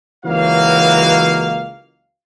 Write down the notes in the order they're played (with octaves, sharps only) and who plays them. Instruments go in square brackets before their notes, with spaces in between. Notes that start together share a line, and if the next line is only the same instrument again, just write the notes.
[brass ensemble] C#2 E3 F#3 A#3 F#4 F5